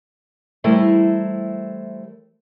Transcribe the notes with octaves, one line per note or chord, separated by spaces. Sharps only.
E3 G3 A3 E4 A#4 C5